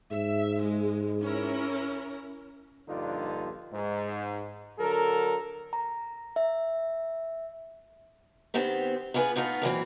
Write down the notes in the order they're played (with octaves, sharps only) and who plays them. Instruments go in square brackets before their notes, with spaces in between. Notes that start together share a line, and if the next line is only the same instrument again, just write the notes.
[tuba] G#2 [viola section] E5
[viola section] G#3
C#4 E4 A#4
[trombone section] A#1 G2 D3 D4 D#4 F4
G#2
D3 F#3 A4 A#4
[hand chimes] A#5
E5
[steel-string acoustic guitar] D#3 B3 C4 G4 C5
B3 F4 G#4 A#4 B4
A3 B3 D#4 F4
F#2 A#2 E3 C4